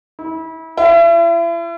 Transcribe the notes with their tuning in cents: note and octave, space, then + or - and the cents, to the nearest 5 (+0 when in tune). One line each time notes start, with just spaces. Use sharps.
E4 -30
E4 +40